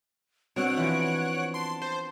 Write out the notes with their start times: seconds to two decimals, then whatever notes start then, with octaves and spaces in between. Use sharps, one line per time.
0.56 B2 B3 C4 D4 C#5 F#5 F#6 D7
0.77 E3 F3
1.54 A5 C6
1.82 C5 C6